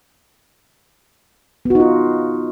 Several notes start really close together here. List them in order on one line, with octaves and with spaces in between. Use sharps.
B3 F#4 D#4 F4